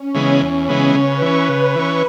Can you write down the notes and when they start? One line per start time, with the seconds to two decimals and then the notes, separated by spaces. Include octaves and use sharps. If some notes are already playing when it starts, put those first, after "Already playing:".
Already playing: C#4
0.14 C#3 E3 G#3 B3
0.41 E2
0.69 C#3 E3 G#3 B3
0.95 C#3 B4
1.22 E3 C#4
1.49 C#3
1.76 E3 C#4